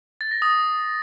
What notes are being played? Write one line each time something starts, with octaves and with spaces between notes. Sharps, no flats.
A6
A#6
D#6